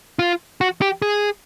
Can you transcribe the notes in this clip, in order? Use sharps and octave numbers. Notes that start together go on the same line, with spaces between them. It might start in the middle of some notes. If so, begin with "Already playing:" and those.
F4
F#4
G4
G#4